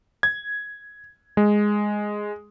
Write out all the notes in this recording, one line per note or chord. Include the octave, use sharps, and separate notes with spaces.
G#6
G#3